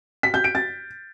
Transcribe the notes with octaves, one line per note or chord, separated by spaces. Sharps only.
B6
G6
D7
A6